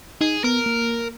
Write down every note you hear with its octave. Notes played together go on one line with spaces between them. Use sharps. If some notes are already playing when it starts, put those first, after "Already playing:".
D#4 G#4
B3 A#4
A#3